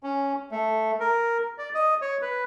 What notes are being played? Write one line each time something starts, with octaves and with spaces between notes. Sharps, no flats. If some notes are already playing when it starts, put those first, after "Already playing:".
C#4
A3
A#4
D5
D#5
C#5
B4